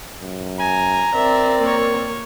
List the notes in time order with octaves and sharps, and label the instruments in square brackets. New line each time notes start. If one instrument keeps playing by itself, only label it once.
[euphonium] F#2
[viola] G#5 [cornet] A#5
[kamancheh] C4 D5 [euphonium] A#4 [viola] E5
[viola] A#3 C#5